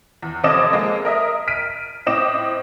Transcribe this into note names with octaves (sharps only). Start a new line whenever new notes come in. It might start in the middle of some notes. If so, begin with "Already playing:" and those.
E2
F1 C4 A4 D#5 D6 E7
G#3 A#3
A#4 D#5 E5
F6 B6 D7 D#7
A2 C4 D#5 D6 E7